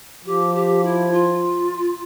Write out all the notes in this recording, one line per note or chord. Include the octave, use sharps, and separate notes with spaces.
F3 G4
G4
E4
F4